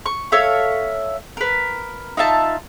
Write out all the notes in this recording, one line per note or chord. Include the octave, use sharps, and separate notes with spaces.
C#6
A4 C#5 E5 F5
A#4 B4
D#4 F4 E5 A5